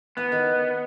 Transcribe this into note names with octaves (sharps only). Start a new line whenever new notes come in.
E3 B3
D#3